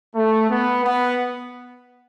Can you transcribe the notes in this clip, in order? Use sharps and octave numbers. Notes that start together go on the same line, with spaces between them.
A3
B3
B3